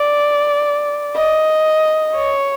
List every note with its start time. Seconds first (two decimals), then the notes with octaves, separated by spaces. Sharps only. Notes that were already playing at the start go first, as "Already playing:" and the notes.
Already playing: D5
1.16 D#5
2.16 C#5